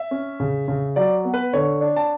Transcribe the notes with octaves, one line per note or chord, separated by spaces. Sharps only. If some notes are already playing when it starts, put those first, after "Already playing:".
Already playing: E5
C#4
C#3
C#3
F#3 D5
B3
B4
D3 C#5
D4
A5